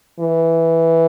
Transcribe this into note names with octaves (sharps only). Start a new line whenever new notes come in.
E3